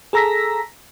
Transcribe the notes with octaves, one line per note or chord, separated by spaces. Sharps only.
G#4 A4 A#5 E6 A#6 B6